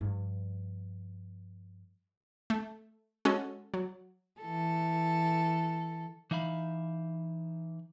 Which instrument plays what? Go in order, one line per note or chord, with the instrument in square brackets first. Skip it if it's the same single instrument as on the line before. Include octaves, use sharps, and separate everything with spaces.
[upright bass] G2 F3
[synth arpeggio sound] A3
G#3 C#4 F#4 A4
F#3
[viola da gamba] E3 A4
[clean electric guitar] E3 D#4 E5 F5 B5